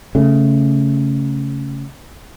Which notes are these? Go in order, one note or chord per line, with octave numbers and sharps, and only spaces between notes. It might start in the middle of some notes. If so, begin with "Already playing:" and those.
C#3 A3